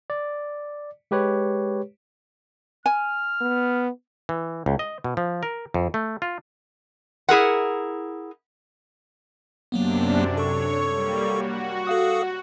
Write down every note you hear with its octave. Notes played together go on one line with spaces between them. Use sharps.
D5
G#3 G4 B4 C#5
G#5 F6
B3
E3
C#2
D#5
B2
F3
A#4
F2
A3
F4
E4 G#4 A#4 F#5
F#2 C3 F#3 A#3 B3 D4
A4 C#5 C#6
G3 A#3
F#4
A4 F5 D#6